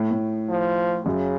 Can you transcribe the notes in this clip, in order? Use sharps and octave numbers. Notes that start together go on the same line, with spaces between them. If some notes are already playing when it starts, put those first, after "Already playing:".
Already playing: A2
A2
F3
F#2 C#3